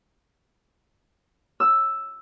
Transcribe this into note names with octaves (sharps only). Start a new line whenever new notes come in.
E6